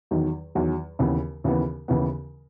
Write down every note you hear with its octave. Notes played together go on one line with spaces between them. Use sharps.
E2 D#3 F#3
E2 D#3 F#3
D#2 C#3 E3 B3
D#2 C#3 E3 B3
D#2 C#3 E3 B3